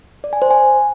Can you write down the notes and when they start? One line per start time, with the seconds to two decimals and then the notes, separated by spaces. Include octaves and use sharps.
0.24 D5
0.33 G#5
0.42 C5
0.51 G#5